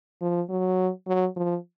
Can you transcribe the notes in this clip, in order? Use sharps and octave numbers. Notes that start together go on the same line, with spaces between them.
F3
F#3
F#3
F3